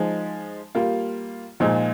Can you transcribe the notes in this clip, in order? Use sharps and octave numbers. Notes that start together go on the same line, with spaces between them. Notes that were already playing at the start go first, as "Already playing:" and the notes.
Already playing: F3 G#3 D#4
G3 A#3 F4
A#2 F3 G#3 D#4